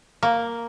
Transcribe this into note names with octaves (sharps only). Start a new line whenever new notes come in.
A#3